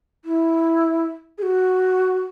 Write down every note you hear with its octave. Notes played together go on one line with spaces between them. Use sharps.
E4
G#4
F#4